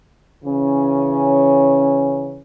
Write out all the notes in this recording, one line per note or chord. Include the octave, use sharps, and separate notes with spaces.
C#3 E3 C#4